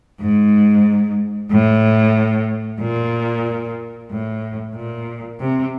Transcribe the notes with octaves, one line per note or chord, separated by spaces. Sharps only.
G#2
A2
A#2
A2
A#2
C3